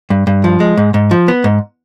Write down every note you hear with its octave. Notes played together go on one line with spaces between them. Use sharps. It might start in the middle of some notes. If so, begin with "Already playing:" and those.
G2
G2
F3
G#3
G#2
G#2
F3
B3
G#2